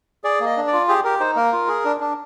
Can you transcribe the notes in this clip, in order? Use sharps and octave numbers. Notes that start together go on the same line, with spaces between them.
G#4 D5
A#3 D#5
D4
D5
F4
G4 G#4
G4 A#4
D#4 C5
A#3 A#4
F4
G#4
D4
D4